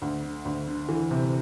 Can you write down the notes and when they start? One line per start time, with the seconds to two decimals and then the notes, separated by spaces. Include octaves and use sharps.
0.02 D2
0.24 D3
0.45 D2
0.67 D3
0.89 E3
1.11 C3